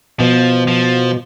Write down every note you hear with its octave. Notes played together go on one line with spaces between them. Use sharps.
B2 F3
F3